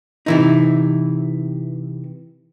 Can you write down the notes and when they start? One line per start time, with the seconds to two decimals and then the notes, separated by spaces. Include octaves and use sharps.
0.26 C3 E3 D#4